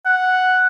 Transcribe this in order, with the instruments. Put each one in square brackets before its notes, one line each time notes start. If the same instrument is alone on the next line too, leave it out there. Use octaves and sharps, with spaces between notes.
[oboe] F#5